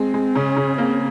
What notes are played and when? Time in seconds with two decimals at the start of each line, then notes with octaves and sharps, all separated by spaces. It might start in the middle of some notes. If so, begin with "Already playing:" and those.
Already playing: G#3 C4
0.14 G#3
0.35 C#3 C#4
0.57 C#3
0.78 A#3 C4